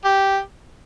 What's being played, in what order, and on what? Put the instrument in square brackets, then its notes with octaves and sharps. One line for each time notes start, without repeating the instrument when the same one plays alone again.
[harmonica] G4